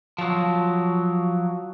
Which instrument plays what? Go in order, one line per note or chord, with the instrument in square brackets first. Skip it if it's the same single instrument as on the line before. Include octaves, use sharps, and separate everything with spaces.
[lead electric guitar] F3 F#3